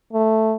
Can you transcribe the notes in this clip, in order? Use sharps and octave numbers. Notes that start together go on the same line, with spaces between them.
A3